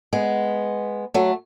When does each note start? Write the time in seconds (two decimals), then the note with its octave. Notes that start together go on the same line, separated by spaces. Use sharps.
0.13 G#3 B3
1.14 F#3 A3